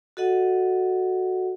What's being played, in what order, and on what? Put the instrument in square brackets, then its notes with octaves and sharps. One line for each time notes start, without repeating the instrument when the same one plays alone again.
[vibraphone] F#4 A4 D#5 F#5